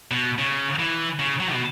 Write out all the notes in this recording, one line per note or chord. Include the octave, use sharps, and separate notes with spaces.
B2
C#3
E3
C#3
F#3
B2